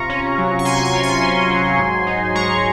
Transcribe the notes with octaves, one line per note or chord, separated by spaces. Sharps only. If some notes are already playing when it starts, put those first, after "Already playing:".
Already playing: C3 F4 A#5 C#6
C#4
F#3
C#6
C3 G#5 C6
G#5 C6
F4
G#5 C6
C#4
F#3
G#2
D#4
G#3 A#5 C#6